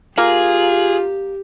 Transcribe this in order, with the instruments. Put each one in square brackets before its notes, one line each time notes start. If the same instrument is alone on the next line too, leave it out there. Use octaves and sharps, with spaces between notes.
[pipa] A#3 [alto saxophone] F4 [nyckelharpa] G4 [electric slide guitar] G#4